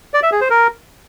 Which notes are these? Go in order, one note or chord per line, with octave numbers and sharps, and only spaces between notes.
D5
E5
G#4
C5
A#4